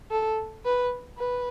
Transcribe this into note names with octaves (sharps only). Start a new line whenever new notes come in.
A4
B4
B4